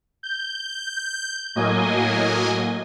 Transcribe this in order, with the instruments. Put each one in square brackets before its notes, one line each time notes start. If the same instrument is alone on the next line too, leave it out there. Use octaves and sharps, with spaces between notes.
[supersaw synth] G6
A2 F#3 A#3 D#5 G#5